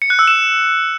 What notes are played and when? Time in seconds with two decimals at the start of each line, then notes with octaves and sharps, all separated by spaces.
0.02 C#7
0.10 F#6
0.19 E6
0.27 E7